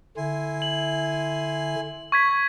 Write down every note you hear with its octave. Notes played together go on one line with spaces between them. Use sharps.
D3 E4 G#5 C6
F#7
C#6 G#6 B6